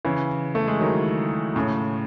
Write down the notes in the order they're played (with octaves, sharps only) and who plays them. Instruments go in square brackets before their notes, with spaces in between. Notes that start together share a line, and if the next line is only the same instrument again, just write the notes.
[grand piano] C#3 E3
A3
G#3
D#3 F#3
A2 C#3